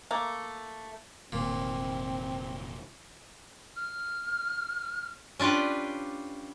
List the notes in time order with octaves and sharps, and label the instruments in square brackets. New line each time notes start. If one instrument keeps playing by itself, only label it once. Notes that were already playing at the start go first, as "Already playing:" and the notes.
[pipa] A3 A#3
[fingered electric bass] F1 D#3 A#3 [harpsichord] A#2 [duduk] C4
[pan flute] F6
[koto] C#4 D4 F4 G4 B4